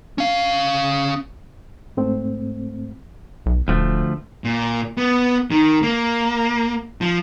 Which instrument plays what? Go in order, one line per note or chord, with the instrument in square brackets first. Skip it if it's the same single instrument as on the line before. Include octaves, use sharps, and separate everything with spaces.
[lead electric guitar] C#4 F5
[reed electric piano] G#2 A3 C4
[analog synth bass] B1
[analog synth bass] D#1 [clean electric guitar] D2 F3 A3
[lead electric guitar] A#2
B3
D#3
A#3
F3